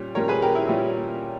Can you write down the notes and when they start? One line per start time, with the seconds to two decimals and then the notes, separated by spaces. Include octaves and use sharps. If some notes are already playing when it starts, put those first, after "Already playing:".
Already playing: A#2 G3 C#4
0.15 A#2 G3 C#4 A#4 C#5
0.28 G#4 B4
0.42 G4 A#4
0.55 E4
0.67 A#2 G3 C#4 E4